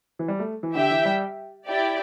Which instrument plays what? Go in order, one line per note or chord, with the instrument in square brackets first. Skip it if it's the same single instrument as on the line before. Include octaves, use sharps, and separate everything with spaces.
[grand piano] E3
G3
A3
E3
[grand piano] D3 [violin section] G4 E5 G5
[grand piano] E3
G3
[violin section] E4 G4 D5 G5